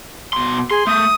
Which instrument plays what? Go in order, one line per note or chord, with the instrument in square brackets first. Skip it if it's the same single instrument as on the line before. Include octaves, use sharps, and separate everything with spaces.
[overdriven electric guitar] B2 C6
[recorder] G#4 [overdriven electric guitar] C6
[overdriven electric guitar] A3 [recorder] D#6